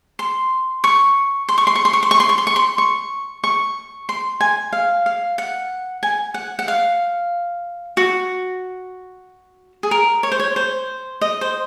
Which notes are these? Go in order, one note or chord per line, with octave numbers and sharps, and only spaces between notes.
C6
C#6
C6
C#6
C6
C#6
C6
C#6
C6
C#6
C6
C#6
C6
C#6
C6
C#6
C#6
C6
G#5
F5
F5
F#5
G#5
F#5
F#5
F5
F#4
G#4
A#4
C#5
C5
C#5
C5
D#5
C5